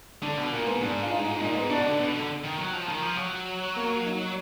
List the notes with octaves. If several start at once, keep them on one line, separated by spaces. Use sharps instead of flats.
D3 D4
B2
A#2 A#3
G#2 B3
G#2 D4
F4
D#4
A#2 D#4
G#2 B3
B2 D4
D3
B2
D3
D#3
F#3
F3
D#3
F3
F#3
A#3
D#4